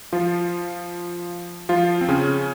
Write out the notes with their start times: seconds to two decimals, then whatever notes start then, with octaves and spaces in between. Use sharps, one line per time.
0.13 F3 F4
1.69 F3 F4
2.01 C4
2.08 C#3 C#4